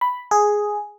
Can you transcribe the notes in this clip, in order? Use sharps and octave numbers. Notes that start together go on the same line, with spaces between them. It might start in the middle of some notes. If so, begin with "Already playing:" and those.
B5
G#4